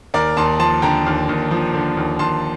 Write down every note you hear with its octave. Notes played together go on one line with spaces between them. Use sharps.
D#2 A#4 D5
D#2 A5 C6
F3 A5 C6
D3 G5 A#5
D#2
D#2
F3
D3
D#2
D#2 A5 C6